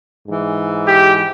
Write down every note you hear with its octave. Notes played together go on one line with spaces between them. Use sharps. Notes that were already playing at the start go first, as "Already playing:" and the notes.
G#2 E3
G4